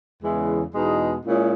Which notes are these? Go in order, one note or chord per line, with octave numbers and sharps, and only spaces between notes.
E2 C#3 E3 G#3
E2 B2 G#3 D#4
A#2 G#3 C#4 E4